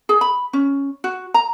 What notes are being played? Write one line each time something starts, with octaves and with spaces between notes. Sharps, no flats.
G#4
B5
C#4
F#4
A#5